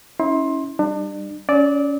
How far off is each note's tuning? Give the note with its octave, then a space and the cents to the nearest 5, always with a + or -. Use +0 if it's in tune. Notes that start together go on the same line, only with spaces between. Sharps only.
C#4 +0 E4 -35 C6 +15
G3 +0 D4 +35
C#4 +25 D5 -5 E6 -40